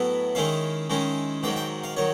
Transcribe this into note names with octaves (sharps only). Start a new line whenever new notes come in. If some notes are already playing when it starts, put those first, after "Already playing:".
Already playing: A2 F#3 B3 E4
D#3 G#3 C#4 E4 F5
D#3 G#3 C#4 E4
G#2 D#3 F#3 G5
G5
F5
D#3 F#3 C#5